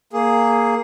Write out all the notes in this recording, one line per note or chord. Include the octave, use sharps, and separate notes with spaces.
A#3 G#4